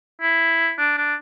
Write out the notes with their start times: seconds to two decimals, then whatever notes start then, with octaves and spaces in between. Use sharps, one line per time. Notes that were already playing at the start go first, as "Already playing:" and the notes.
0.22 E4
0.79 D4
0.98 D4